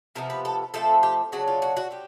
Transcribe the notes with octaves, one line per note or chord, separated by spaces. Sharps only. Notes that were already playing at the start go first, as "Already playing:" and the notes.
C3 F3 B3 A#4
B4
A4
F3 A3 C4 A4
G4
C#3 F#3 A3 D4 F#4
F4
F#4
F#4
C4 G4